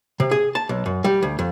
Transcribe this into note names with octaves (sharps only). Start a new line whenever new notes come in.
C3
G#4
A5
B1
F#2
G3
D2
F2